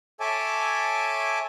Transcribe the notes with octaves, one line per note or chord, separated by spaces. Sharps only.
A4 C#5 E5 G#5 A5 D6